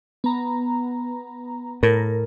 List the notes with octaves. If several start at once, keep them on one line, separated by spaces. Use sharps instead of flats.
B3 A#5
A2 A#4